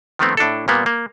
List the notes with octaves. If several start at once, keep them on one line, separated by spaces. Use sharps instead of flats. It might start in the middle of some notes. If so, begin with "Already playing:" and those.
D#3 F3 A3 B3 C4
A2 D4 E4 A4
A#2 G3 A#3 B3
A#3